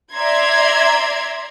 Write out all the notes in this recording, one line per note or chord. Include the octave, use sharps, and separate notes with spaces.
D5 E5 A#5 C6 G#6